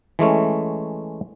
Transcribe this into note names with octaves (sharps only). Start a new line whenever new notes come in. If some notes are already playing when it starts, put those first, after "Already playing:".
E3 G#3 A3 C#4